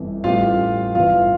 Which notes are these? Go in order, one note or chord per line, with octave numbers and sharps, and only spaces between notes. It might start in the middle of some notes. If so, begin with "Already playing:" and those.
Already playing: G1 F2 E3
A1 A2 G3 F4 F5
G1 G2 E3 F4 F5